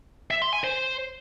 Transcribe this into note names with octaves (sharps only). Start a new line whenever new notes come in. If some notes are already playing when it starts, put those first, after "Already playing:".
E5
C6
G#5
C5